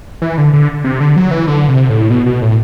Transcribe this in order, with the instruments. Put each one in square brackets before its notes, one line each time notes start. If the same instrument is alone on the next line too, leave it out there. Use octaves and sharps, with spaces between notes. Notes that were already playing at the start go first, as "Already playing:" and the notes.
[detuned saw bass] E3
D3
D3
C3
D3
F#3
E3
D3
C3
A2
B2
B2
A2